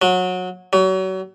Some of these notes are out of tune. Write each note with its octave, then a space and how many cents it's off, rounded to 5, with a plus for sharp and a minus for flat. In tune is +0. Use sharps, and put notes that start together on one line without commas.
F#3 -20
F#3 +35